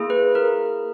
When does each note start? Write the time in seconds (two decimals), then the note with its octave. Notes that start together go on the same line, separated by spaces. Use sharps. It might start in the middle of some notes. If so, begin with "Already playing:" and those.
Already playing: A#3 E4 G#4
0.10 B4
0.35 A#4